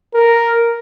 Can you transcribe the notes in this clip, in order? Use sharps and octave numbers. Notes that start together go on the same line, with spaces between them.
A#4